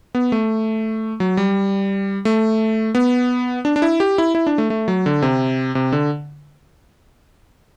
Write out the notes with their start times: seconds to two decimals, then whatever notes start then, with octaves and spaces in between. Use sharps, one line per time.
0.15 B3
0.32 A3
1.20 F#3
1.37 G3
2.25 A3
2.95 B3
3.65 D4
3.76 D4
3.82 E4
4.00 G4
4.18 E4
4.35 E4
4.47 D4
4.58 A3
4.70 A3
4.88 F#3
5.06 D3
5.22 C3
5.75 C3
5.92 D3